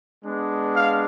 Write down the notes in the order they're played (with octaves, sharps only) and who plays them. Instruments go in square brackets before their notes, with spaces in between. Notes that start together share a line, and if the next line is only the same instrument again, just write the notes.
[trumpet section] G#3 B3 D4
F5